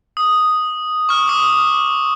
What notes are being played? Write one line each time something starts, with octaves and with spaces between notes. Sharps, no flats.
D#6
C#6 F6
D6 D#6 F6